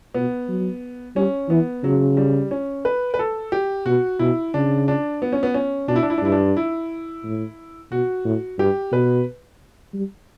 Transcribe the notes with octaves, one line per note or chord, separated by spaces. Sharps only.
B2 B3
F#3
G3 C#4
E3 B3
C#3 F#3
G3
C#4
B4
B4
A4
G4
B2 F#4
B2 E4
C#3 D4
D4
B3
C#4
B3
C#4
B2 D4
E4
D4
E4
D4
G2 E4
D4
E4
A2
B2 F#4
A2
G2 G4
B2 B4
G3